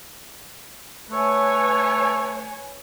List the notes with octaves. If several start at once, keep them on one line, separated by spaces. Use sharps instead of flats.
A3 B4 C#5 G#5